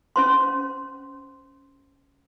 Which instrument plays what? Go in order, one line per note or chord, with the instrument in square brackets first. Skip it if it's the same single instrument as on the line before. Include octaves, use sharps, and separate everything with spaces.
[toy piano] C#4 C5 C6